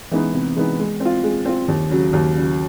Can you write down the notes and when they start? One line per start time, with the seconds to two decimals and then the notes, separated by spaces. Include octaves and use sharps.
0.11 E3 G#3 B3 D#4
0.33 C3
0.56 E3 G#3 B3 D#4
0.79 G#3
1.00 C4
1.05 F4
1.23 G#3
1.45 C4 F4
1.68 D#2
1.91 C#3 F#3
2.13 D#2
2.36 C#3 F#3